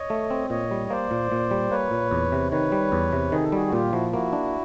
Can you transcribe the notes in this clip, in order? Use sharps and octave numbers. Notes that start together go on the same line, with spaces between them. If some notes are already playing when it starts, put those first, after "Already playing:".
Already playing: C#5 D#5
A3
C4
A#2 C#5 D#5
G3
A#3 C5 D5
A#2
A#2
G3
A#3 B4 C#5
A#2
E2
C3
D#3 B4 C#5
G3
E2
C3
D#3 G#4
A4
G3 F#4 G#4
F#4
A#2 F4 G4
F3 E4 F#4
A#3 E4 F#4
D4